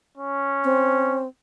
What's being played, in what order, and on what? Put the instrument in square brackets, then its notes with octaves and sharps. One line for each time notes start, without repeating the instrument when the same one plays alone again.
[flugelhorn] C#4
[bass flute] C4